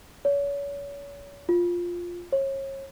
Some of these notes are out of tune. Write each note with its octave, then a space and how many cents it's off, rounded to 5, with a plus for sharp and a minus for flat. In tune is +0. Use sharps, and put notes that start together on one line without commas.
C#5 +35
F4 +5
C#5 -30